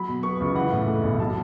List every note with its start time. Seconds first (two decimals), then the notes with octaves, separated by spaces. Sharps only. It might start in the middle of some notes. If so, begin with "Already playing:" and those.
Already playing: F#3 B5
0.08 B2
0.23 B3 C#6
0.40 C#2
0.55 E3 F#5
0.72 A2
0.88 A3
1.04 B1
1.20 F#3 A5